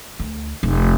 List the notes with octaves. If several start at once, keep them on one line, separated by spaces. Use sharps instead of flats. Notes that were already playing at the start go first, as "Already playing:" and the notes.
D2
F1